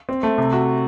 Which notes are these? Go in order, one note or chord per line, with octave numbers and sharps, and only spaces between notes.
C4
A3
C3
F#4